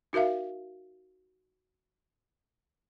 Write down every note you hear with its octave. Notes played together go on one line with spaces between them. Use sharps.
D#4 F#4 A#4 E5 F5